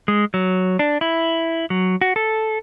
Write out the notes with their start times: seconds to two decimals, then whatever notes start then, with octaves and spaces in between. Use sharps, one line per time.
0.08 G#3
0.34 F#3
0.79 D4
1.01 E4
1.70 F#3
2.01 F#4
2.16 A4